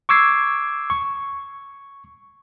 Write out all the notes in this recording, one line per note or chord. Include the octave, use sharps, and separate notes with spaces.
C#6 D6 E6 G#6 C7
C#6